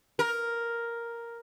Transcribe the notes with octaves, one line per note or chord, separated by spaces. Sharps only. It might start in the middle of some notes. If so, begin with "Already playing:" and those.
A#4